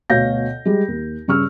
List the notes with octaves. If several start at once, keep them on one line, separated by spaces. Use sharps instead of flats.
D2 B2 C#5 F5 G6 A#6
G3 G#3
D#2
G2 C#3 C#6 E6 F6